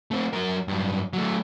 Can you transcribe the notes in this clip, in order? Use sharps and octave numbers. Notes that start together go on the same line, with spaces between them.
A3 C4
F#3 A#4
G2 F#3
F#3 A3